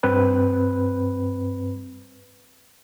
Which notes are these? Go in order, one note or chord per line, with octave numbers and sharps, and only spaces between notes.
G2 C4 B4 B5